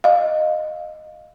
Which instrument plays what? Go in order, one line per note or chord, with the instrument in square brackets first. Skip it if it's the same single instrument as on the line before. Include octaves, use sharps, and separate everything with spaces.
[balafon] D#5 F5